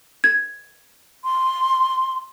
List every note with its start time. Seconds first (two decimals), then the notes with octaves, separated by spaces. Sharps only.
0.24 G#6
1.24 C6